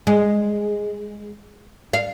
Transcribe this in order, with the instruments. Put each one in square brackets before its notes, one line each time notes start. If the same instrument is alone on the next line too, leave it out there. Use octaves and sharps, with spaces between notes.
[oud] G#3
F5